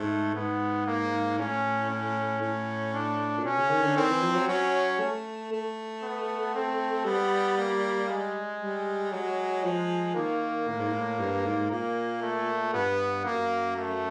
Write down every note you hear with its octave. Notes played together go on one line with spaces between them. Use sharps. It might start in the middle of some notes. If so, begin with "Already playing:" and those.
Already playing: G#2 A3
G#2 B3
A#3
A2 C#4
C#4
A2
D4
A#2
B2 C#4
C#3
D#3
D3
D#3 C4
E3
F3
F#3
F#3 C#4
A3
A3
B3
C4
G3 B3
A#3
G#3
G3
F#3 G#3
F3
D#3 A#3
A2
G#2
A2
G2
G#2
A#2 A#3
A3
G2 B3
F#2 A#3
A3